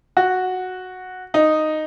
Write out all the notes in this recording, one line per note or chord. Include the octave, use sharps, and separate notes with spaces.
F#4
D#4